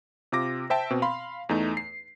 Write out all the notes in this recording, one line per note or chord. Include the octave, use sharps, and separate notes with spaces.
C3 F4 D6 A#6
C5 E5 G5 A5
B2 C4
F5 B5 C6
E2 A3 D#4
C7